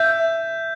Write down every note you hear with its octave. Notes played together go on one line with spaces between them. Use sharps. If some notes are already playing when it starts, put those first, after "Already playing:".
Already playing: E5 G6